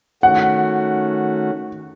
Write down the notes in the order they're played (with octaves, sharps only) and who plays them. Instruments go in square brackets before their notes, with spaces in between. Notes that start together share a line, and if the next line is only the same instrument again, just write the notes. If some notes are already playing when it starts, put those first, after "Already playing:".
[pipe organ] D#3 A3 C#4 F#4 [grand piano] F#5